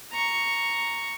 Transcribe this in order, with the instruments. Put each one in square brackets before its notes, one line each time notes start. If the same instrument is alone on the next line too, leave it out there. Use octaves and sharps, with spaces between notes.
[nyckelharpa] A#5 C#6